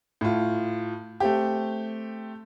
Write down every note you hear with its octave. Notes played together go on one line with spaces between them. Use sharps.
A2 F4
A3 C4 G4